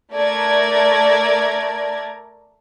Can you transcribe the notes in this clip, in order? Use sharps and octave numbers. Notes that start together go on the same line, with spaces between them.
A3 A#4 D5 G#6